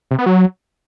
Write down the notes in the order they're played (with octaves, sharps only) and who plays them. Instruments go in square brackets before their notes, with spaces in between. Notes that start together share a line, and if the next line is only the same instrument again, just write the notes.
[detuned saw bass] C3
B3
F#3